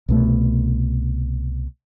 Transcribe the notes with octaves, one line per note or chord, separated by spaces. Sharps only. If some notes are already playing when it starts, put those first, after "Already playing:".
C2 B2 A3